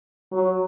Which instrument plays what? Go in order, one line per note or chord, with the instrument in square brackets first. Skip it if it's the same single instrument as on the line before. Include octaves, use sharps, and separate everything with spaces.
[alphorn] F#3